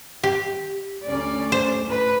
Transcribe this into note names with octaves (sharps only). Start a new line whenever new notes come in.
G4
D2 C#4 D5
C5
A2 B4